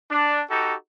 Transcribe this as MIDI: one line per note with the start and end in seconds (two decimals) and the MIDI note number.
0.11 0.43 62
0.51 0.76 63
0.51 0.76 66
0.51 0.76 67
0.51 0.76 69